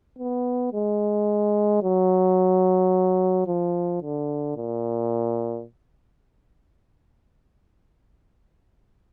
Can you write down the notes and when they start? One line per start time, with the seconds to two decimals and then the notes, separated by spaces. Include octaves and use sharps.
0.18 B3
0.73 G#3
1.83 F#3
3.47 F3
4.02 D3
4.57 A#2